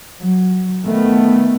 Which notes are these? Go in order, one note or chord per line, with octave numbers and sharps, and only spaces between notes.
F#3
D#3 A3 B3